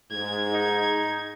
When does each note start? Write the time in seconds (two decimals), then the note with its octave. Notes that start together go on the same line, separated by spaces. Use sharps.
0.11 G#2 G#6
0.53 D#4